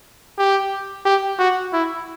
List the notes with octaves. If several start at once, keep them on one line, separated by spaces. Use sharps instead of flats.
G4
G4
F#4
E4